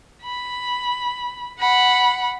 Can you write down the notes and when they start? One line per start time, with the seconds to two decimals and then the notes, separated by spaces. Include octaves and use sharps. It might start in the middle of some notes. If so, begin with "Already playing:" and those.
0.23 B5
1.59 F#5 B5